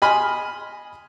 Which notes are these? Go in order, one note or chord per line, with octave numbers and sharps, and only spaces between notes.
D#5 G#5 B5 C6 D#6 F6